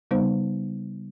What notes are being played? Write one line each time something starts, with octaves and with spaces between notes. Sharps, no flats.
C#3 G3 B3 D#4 C5